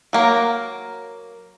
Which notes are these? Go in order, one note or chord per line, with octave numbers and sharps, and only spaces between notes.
F#3 A#3 A#4